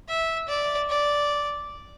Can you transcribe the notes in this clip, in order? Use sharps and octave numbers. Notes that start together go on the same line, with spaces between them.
E5
D5
D5